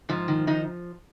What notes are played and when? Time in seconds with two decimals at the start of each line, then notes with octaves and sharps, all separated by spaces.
0.09 G#2 F3
0.28 D#3
0.47 D#3 D#4